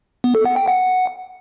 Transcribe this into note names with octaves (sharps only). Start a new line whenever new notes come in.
B3
A4
F#5
G5
F#5